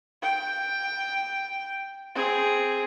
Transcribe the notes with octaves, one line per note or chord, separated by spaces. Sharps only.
G5
C4 G#4